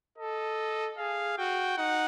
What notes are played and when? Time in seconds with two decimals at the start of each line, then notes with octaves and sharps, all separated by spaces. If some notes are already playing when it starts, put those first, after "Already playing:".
0.18 A4 D#5
0.98 G#4 F5
1.38 F#4 G5
1.78 D#4 F#5